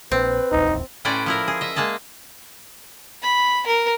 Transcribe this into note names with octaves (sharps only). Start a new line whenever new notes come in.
A#1 C4 B4
D1 A#1 E2 D#4
A2 C#4 B4 C5 D5 G5
F3 E4 A#4
G#4
D#5 E5
G#3 A#3 G#4 A5
B5
A#4